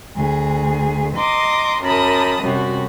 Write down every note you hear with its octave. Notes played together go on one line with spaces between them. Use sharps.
D2 G#4
D#5 A#5 C6 D6 D#6
F#2 A#4 A5 B5 D#6
F#2 C3 G3 F#4